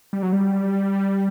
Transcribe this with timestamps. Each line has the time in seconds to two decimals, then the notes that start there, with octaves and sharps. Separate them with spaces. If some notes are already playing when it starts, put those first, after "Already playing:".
0.13 G3
0.23 F#3
0.33 G3